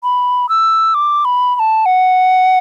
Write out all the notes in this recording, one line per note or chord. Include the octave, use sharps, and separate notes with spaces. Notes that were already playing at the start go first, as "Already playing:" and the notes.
B5
E6
D6
B5
B5
A5
F#5